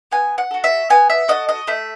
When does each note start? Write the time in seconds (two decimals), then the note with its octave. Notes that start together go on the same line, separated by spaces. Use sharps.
0.12 B3 G#5
0.38 F#5
0.51 F#4 A4
0.64 E5
0.90 B3 G#5
1.10 E5
1.28 F#4 A4 D#5
1.49 D#5
1.67 A3 E5